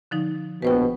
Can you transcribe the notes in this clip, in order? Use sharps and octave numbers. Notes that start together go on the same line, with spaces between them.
D3 F3 D#4
A#1 B2 B4 C5 G5